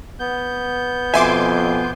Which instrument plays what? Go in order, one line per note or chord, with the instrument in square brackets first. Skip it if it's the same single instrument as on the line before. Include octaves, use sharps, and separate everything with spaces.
[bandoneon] B3 G6
[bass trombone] F2 [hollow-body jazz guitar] B2 E5 [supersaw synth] G#5 C6 D6